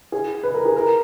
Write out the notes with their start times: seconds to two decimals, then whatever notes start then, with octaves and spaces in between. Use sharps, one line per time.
0.12 G#4
0.43 B4
0.54 A#4
0.65 G#4
0.77 A#4